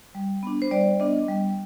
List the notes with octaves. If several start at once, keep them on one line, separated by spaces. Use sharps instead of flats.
G3
B3 D4
C5
G3 D5
B3 D4 D#5
G3